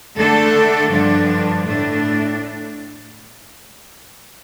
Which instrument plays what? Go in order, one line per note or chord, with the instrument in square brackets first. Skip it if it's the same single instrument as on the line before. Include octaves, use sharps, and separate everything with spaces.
[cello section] D3 A3 D4 A4
G2 D3 F3 D4
A2 A3 D4